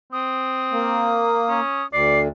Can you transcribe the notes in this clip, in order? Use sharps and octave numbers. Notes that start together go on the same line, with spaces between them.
C4 D#6
A#3
C#4
D2 D5 C7